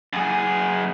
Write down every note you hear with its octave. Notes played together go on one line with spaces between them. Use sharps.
F#2 G#4